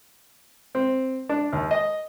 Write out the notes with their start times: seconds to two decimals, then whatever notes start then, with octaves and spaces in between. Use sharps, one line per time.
0.75 C4
1.29 D4
1.53 D#2
1.71 D#5